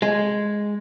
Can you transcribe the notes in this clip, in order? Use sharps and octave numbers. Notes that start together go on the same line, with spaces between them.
G#3